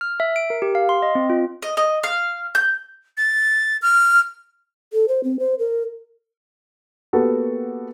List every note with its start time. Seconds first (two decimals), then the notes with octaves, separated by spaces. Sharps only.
0.01 F6
0.20 E5
0.36 D7
0.50 A#4
0.62 G4
0.75 F5
0.89 C6
1.02 D#5
1.15 C4
1.30 F4
1.62 D#5
1.77 D#5
2.03 F5
2.55 G6
3.17 A6
3.82 F6
4.93 A4
5.08 C5
5.24 C4
5.39 C5
5.59 A#4
7.13 A#3 B3 F#4 G4 A4 B4